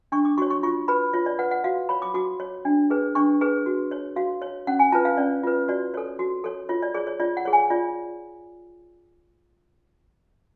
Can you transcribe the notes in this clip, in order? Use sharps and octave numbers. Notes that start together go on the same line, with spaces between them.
D4 C#6
D6
F#4 C#5 C#6
C#6
F4 C#6
B4 B5
F4 C#5
D5
B4 F#5
F#5
F#4 F5
C#5 B5
D6
F#4 D6
C#5
D4
G#4 B4
D4 C#6
G#4 B4
F#4
C#5
F#4 F5
C#5
C#4 F#5
G#5
F4 B4 A5
F5
C#4 D5
F4 B4
F#4 D5
A4 C#5
F#4
A4 C#5
F4 C#5
D5
G#4 C#5 D5
C#5
F4 D5
F#5
G#4 C#5
G#5
F4 D5